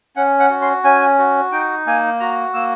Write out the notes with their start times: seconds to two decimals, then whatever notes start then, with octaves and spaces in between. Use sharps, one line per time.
0.16 C#4 F#5
0.40 F#5
0.50 F#4
0.62 C6
0.84 C#4 G#5
1.18 F#4
1.52 D#4 G5
1.87 A#3 G#5
2.20 F#4 A#5
2.54 A#3 E6